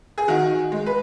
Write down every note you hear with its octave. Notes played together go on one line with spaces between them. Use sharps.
G#4
D#3 F#4
G#3
B4